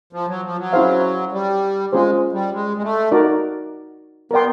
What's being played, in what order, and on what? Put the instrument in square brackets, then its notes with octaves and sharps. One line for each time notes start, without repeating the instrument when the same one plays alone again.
[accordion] F3
F#3
F3
F#3
[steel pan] C#4 E4 G#4 C5 F5
[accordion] G3
[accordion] G#3 [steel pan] C#4 F4 G#4 C5
[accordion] G3
G#3
G#3
A3
[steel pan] D#4 F#4 A#4 D5
[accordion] B3 [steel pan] A#4 D5 G5 C6